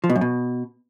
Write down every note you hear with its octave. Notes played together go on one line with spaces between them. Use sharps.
F3
B2
F#2
B2